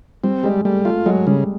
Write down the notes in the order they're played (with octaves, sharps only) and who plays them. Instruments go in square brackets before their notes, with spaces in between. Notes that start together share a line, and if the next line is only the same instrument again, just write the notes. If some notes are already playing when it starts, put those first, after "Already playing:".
[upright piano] G3 [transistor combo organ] C4
[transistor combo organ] G3 [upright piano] G#3
[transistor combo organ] G3 [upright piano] A3
[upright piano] A3 [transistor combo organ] F4
[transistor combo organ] F#3 [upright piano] G#3
[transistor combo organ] C#3 [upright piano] G3